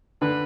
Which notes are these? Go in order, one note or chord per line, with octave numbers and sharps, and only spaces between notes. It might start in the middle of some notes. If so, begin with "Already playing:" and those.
D3 B4